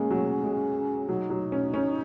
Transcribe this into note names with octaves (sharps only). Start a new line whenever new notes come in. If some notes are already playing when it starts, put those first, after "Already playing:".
Already playing: G#3 A#3 C#4
F#3
G#3
F#3 D#4
F#3
C#4
C#4